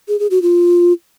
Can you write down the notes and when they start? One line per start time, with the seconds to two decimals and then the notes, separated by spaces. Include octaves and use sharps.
0.08 G#4
0.19 G#4
0.31 F#4
0.42 F4